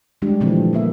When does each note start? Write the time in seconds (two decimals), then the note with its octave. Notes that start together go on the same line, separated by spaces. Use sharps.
0.22 D#3 G3 G#3 D4 G4
0.40 A#2 D3 E3 F3 A3 C4
0.73 G3 A#3 E5